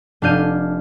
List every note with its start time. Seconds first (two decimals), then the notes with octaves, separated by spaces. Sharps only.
0.22 F1 D4 F5 G6 D#7